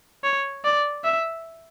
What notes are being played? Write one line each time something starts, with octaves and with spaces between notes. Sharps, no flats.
C#5
D5
E5